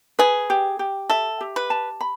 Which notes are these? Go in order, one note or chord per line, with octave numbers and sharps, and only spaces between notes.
G#4 B4
G4
G4
A4 E5
G4
B4
A5
B5